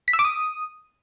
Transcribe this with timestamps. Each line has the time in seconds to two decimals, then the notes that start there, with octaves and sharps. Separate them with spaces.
0.08 B6
0.13 E6
0.19 D6
0.24 D#6